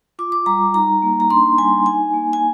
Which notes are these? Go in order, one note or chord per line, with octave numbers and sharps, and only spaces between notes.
F4 D6
D6
G3 A#5
D#4 A#5
A#3
A#5
D4 C6
G3 G#5
D#4 G#5
A#3
G#5